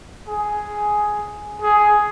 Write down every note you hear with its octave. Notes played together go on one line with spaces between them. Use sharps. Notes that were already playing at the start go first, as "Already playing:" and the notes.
G#4
G#4